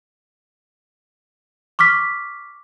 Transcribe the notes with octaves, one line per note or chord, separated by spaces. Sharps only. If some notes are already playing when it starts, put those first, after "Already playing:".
C#6 D6 F6 B6